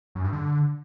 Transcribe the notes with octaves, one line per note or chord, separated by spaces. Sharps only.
F#2
G2
D3